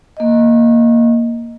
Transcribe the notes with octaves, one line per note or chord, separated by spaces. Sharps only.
A#3 D#5